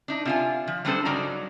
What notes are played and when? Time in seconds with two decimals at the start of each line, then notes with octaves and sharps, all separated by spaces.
0.08 D4 D#4
0.25 C3 F4 G#5
0.68 F3
0.85 F#3 G3 B3 D4 A4 C5
1.05 G2 C#3 F#3 D#4 D5 A#5